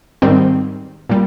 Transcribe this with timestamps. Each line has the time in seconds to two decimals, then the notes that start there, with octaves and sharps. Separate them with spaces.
0.22 G#2 D#3 G3 C4
1.09 A#2 G3